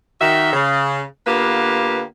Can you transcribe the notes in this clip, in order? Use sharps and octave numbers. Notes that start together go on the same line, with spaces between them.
D#3 F#4 E5
C#3
D3 A#3 B3 F4 G4 B4